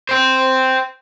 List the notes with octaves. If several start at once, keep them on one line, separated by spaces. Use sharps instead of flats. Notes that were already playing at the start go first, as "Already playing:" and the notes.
C5 G5